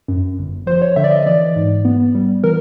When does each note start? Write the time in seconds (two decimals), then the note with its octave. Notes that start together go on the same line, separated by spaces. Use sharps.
0.08 F#2
0.38 G1
0.67 F3 C5
0.82 C#5
0.96 D3 E5
1.04 D5
1.11 D#5
1.26 E3 D5
1.56 G#2
1.85 B3
2.15 G3
2.44 E3 A#4